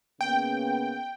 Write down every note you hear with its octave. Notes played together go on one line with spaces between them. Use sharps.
C#3 A#3 B3 G5